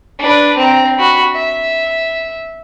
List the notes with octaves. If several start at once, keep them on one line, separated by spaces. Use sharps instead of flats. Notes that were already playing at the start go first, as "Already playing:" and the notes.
D4 B4
C4 A#5
F#4 B5
E5